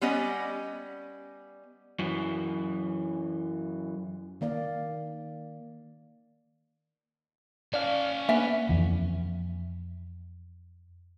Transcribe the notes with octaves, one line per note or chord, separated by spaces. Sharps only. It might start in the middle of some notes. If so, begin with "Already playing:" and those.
G3 B3 C#4 D5 D#5
F#2 E3
D#3 A#3 D5 F5
C#4 D5 F5 A5
A#3 B3 D4 E5
F2 E3